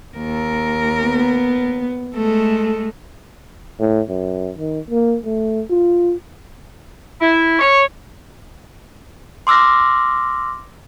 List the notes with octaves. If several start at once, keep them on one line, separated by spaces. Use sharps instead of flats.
D#2 A#4
B3
G#3 A3 A4
A2
F#2
D#3
A#3
A3
F4
E4
C#5
C6 D6 E6 F6 A#6